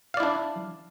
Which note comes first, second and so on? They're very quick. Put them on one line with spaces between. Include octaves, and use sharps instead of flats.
F5 D5 E4 D4